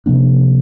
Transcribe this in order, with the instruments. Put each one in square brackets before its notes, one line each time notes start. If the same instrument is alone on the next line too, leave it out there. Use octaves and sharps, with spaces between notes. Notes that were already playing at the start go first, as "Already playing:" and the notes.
[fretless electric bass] C3 F3 A#3 D4